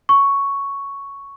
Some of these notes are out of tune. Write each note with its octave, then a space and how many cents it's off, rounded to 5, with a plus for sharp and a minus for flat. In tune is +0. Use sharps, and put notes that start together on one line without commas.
C#6 +5